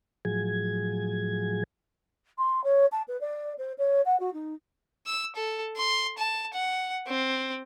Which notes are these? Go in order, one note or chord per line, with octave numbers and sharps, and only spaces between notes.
A2 F3 F#3 G#4 G#6
C6
C#5
A5
B4
D5
C5
C#5
F#5
F#4
D#4
E6
A4
C6
A5
F#5
C4